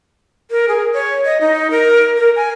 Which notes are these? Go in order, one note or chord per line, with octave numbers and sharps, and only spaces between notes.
A#4
G#4
C#5
D#5
D#4
A#4
A#4
G#5